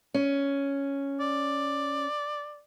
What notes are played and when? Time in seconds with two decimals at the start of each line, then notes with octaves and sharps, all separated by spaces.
0.14 C#4
1.20 D5